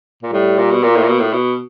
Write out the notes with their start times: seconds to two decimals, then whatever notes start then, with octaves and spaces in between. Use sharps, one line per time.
0.23 A#2
0.32 A2 G3
0.58 A#2
0.72 B2
0.83 A#2 A#3
0.96 A2
1.03 A#2
1.08 B2
1.20 A2
1.33 B2